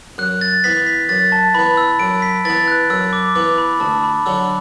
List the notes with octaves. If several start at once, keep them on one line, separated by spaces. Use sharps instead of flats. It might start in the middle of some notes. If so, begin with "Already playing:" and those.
F#2 F#6
A6
E3 B3 B6
B6
F#2 A6
A5
E3 B3 B5
E6
F#2 D7
B6
E3 B3 A6
F#6
F#2 E6
D6
E3 B3 D6
B5
D2 A5
B5
D3 F#3 E6